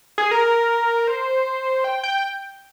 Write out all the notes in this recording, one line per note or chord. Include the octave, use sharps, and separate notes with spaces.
G#4
A#4
C5
G5
G5